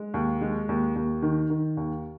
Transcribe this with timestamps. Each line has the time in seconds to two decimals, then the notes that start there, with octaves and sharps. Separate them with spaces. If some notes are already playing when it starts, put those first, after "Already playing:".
Already playing: G#3
0.14 D#2
0.41 G#3
0.69 D#2
0.96 D#2
1.22 D#3
1.50 D#3
1.77 D#2